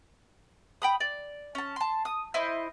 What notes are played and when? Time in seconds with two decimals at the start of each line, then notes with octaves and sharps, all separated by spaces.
0.82 G5 B5 D#6
1.00 D5
1.55 C#4 A5
1.76 A5 C6
2.05 D#6
2.34 E4 C5 D#5